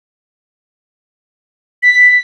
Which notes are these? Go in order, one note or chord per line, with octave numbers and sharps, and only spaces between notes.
B6